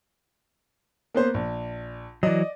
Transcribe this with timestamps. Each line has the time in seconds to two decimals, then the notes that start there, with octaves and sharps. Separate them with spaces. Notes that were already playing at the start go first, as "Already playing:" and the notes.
1.14 A#3 B3 C5
1.34 A#1
2.23 E3 F#3 D5 D#5